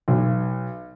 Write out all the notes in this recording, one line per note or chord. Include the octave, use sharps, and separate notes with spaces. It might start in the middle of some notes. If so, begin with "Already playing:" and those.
B1